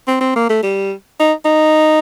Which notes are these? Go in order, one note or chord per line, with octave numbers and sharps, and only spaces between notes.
C4
C4
A#3
A3
G3
D#4
D#4